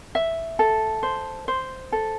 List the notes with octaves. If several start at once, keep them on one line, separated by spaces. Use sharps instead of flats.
E5
A4
C5
C5
A4